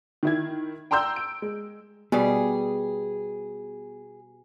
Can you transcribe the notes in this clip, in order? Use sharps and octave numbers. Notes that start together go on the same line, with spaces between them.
D#3 E4 G#6
G5 A#5 C6 E6 G6
D7
G#3
B2 G3 B3 G#4